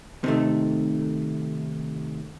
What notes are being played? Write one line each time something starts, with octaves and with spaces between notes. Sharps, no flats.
C3 D#3 A3